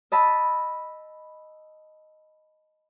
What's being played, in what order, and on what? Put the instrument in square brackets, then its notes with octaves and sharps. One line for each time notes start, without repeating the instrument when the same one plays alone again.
[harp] D#5 A5 B5 E6